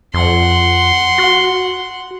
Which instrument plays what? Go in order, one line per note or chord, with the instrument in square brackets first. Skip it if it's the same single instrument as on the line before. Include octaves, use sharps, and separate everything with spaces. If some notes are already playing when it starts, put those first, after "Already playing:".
[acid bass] F2 [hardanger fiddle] F#5 C6
[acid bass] F#4